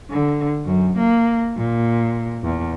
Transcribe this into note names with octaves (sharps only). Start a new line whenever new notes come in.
D3
F#2
A#3
A#2
E2